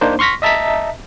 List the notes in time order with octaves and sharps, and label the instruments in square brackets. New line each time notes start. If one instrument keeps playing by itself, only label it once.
[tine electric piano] A#3 D4 D#4 C5
C6 C#6 F6 A#6 B6
D#5 E5 A5 A#5 B6